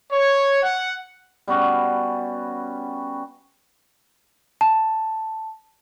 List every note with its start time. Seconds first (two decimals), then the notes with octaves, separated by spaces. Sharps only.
0.11 C#5
0.62 F#5
1.48 G3 B3 C#4 F#4
4.61 A5